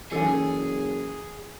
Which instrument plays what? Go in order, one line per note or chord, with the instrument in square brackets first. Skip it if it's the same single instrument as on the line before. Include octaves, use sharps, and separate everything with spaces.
[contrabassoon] F#1 [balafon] E3 C#4 D#4 [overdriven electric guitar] G#4 [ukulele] A4 G#5